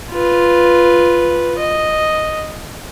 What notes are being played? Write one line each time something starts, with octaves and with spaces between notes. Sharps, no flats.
F4 B4
D#5